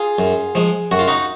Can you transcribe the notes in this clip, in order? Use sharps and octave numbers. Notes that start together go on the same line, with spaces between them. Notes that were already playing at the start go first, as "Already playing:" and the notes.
Already playing: F4 G#4
F#2
F3 G#3
F#2 F#4
F4
D#4 F#4